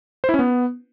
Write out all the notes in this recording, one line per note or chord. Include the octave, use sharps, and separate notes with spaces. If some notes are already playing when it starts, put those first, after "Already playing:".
C5
E4
C#4
B3